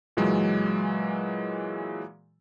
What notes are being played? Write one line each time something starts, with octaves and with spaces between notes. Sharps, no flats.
A#2 E3 F#3 G#3